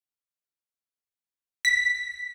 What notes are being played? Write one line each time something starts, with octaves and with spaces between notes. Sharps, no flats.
B6